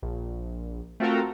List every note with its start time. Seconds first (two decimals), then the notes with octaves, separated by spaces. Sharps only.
0.03 A#1
1.00 A3 C4 F4 F#4 A4 A#4